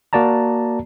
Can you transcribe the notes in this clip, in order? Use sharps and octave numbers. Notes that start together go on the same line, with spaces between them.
A#3 F#4 D5 A5 A#5